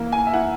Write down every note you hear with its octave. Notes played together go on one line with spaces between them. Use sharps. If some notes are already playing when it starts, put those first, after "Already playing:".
Already playing: E3 A#3
G#5
E5
E4 F#5